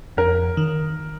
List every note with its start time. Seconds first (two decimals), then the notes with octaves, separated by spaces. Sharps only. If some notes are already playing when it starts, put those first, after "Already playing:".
0.17 F2 A#4
0.57 D#3